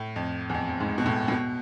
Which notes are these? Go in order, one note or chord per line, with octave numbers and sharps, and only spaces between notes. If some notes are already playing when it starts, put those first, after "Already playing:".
Already playing: A2
F2
E2
F2
F2
G#2
B2
A2
A2
B2